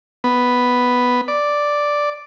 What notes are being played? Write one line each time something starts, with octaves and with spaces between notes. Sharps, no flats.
B3
D5